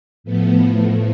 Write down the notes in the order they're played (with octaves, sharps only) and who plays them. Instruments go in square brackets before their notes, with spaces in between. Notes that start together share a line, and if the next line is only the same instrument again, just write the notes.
[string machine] A2 F3 A3 B3